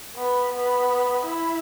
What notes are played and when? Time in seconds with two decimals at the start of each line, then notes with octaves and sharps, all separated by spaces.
0.16 B3
0.52 B3
1.25 E4